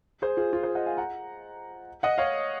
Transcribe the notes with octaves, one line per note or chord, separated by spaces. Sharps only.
G#4 C5
F4 G#4
F4 G#4
G#4 C5
D#5 F#5
F5 G#5
F#5 A#5
D#5 F#5
C#5 F5